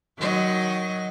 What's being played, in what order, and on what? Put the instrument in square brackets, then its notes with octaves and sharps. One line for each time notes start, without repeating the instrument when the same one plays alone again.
[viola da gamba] D#3 F#3 D#5